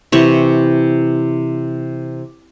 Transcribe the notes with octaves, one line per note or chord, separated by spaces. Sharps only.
C3 E3 C#6